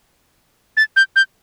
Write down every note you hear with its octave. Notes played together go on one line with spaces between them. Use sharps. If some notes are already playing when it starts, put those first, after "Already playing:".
A6
G6
G6